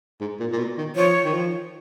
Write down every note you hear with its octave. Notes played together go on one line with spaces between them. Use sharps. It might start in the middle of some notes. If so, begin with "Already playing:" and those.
G#2
A#2
A#2
B2
D#3
F3 C#5
D#3
F3